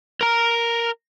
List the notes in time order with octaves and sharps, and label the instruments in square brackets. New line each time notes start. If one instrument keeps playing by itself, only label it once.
[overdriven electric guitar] A#4 A#5